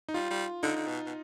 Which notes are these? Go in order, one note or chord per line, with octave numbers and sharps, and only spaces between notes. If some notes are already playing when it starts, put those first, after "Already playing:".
D#4
G3 F4
G3
D3 D#4
D3
B2
B2